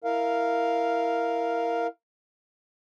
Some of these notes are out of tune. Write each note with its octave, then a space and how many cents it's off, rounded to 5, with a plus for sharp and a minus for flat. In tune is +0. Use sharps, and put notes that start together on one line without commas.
E4 +0 A#4 +0 F5 +0